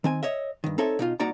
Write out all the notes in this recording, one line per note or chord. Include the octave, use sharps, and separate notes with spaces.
D#3 C4 G#5
C#5 D#5 E5
G2 D#3
C4 D#4 A4 C#5 E5
B2 D#4 F4
C2 A#3 D#4 F#4 D5 A#5